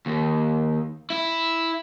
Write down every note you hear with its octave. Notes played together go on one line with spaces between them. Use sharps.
D#2
E4